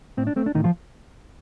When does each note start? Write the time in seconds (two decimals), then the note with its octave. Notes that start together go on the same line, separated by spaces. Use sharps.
0.17 A2 C4
0.27 D4
0.36 A3 C4
0.46 D4
0.55 A2 D#3 D#4
0.64 F3 F4